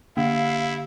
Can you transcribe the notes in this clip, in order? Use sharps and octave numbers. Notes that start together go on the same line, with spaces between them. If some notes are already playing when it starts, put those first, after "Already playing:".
D3 A#3 E4 G4 F5 B6